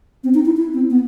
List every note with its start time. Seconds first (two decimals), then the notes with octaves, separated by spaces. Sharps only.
0.24 C4
0.34 D#4
0.46 E4
0.57 E4
0.73 C4
0.90 B3